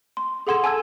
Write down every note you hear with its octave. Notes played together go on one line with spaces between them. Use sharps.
C6
G#4 A4 F#5 C6 G#6 E7
F#5 G#5 A5 E6 G#6